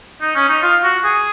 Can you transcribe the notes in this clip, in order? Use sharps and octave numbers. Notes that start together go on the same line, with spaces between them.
D#4
C#4
D#4
F4
F#4
G#4